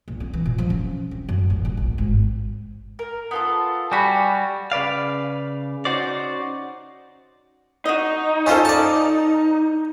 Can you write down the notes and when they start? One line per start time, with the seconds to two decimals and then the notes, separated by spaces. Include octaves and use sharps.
0.08 A#1
0.20 C4
0.33 E3
0.46 A#2
0.58 F3
0.70 C#4
1.11 C4
1.29 F#2
1.50 A1
1.65 D#1
1.77 A#1
1.98 G#1
2.99 A#4
3.31 B3 F4 A4
3.92 G3 F#4 G#5 B5
4.72 C#3 B4 D5 F5
5.85 C#4 D#4 F#4 C5 D5
7.85 D#4 F#4 D#5
8.46 C#4 F4 A4 C5 F5
8.65 D5 A5